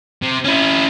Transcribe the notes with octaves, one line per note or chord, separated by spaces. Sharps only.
C3
C#4 E4